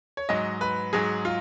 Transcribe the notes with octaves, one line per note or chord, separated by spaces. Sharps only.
C#5
G#2 F#3 D#5
B4
G#2 F#3 G#4
F4